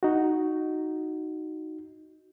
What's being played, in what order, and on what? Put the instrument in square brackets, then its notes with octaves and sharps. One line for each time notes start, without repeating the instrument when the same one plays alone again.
[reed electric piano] D#4 F#4